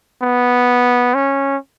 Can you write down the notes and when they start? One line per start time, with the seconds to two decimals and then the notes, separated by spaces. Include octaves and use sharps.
0.23 B3
1.14 C#4